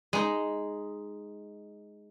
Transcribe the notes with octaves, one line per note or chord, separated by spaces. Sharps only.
G#3 D#4